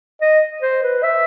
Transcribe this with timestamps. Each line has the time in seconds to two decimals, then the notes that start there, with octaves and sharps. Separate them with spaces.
0.22 D#5
0.62 C5
0.83 B4
1.03 E5